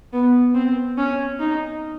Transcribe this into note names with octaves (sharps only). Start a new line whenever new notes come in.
B3
C4
C#4
D#4